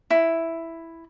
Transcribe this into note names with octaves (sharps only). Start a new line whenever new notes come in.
E4